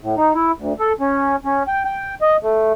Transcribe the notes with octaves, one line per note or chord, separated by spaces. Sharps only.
A2
D#4
E4
D2
A4
C#4
C#4
G5
G5
D#5
A3